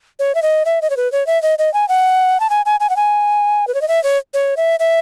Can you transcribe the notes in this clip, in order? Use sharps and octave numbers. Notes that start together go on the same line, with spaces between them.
C#5
E5
D#5
E5
D#5
C#5
B4
C#5
E5
D#5
D#5
G#5
F#5
A5
G#5
G#5
G#5
F#5
G#5
B4
C#5
D#5
E5
C#5
C#5
E5
E5